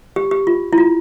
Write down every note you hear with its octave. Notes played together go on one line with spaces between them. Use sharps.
G4
G4
F4
E4
F4